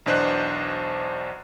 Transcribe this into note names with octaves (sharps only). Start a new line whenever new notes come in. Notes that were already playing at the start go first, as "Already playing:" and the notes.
B1 E2 D4 C5 D#5 F#6